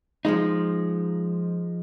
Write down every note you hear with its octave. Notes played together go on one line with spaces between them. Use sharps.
F3 G#3 D#4